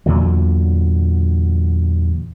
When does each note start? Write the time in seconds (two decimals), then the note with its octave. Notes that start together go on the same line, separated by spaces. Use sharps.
0.06 E2 A#2 D3 F#3